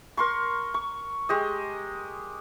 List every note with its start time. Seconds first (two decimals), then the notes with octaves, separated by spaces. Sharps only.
0.17 A#4 C6 C#6
0.74 C#6
1.29 G#3 G4 D#5